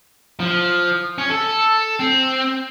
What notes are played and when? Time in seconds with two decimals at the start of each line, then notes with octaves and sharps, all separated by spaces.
0.40 F3
1.18 C#4
1.30 A4
2.00 C4